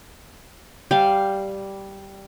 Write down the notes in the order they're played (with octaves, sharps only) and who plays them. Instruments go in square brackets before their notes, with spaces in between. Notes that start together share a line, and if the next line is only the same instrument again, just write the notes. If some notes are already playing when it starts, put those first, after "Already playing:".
[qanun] G3 F5